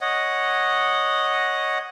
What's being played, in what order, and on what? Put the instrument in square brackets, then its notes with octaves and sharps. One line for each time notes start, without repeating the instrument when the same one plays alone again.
[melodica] C#5 D#5 F#5